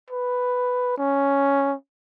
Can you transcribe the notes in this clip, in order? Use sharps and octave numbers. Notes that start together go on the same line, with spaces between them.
B4
C#4